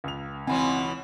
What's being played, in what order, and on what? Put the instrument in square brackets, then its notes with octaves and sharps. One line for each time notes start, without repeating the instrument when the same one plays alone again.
[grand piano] C#2 F7
[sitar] B2 E3 C#4 [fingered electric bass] C4 [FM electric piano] G#5 B5 C6